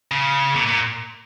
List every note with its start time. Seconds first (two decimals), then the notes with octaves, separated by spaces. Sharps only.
0.11 C#3
0.56 A#2
0.66 A#2